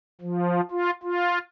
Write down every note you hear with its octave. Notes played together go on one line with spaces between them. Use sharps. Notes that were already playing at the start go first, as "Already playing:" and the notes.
F3
F4
F4